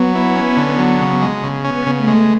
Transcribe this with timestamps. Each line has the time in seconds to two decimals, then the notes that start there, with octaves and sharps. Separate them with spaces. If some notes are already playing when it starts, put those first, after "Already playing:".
Already playing: F#3 B3
0.15 E4
0.36 C#4
0.57 D3
0.79 F#3
1.01 C#3
1.22 G#3
1.44 C#3
1.65 B3 C#4
1.86 C#3
1.97 A3
2.07 G#3